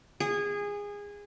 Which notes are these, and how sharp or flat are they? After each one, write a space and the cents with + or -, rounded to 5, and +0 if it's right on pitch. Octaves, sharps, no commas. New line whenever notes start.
G#4 -20